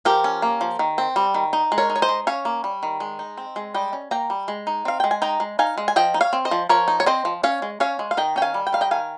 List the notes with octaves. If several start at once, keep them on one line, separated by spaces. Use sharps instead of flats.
F3 G4 A#4
C#4
A#3
F3
D#3
C4
G3
D#3
D#4
G#3
A#4 C#5
D#4
C#5
C5 D#5
G#3
C#4 C#5 F5
A#3
G3
D#3
G#3
D#4
C4
G#3
G3 D#5 G5
C#4
A#3 G5 A#5
G3
G#3
D#4
C4 F5
G#3 G5
G#5
D#4 G5 A#5
G#3
D#4 F5 G#5
G#3
G#5
F3 D#5 G5
D#4
C#5 F5
C4
C5 D#5
F3
F3 A#4 C#5
D#4
C#5
C4 C5 D#5
F3
C#4 C#5 F5
G#3
C#4 C#5 F5
G#3
F5
D#3 D#5 G5
C#4 G5
F5 G#5
G3
G5
D#3 F5
D#5 G5
D#3 F5 G#5